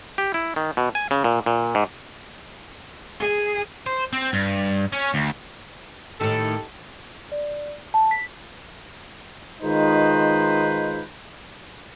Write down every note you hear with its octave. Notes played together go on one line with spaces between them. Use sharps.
G4
E4
D#3
B2
G#5
C#3
A#2
A#2
G#2
G#4
C5
C4
G2
C#4
D2
A2 D#3 D#4 G4 A4
D5
A5
B6
D#3 G#3 D#4 F4 B4 C5